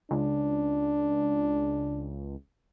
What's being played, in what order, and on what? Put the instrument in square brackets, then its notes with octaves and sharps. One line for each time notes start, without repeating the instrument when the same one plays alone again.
[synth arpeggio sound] C#2 [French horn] D4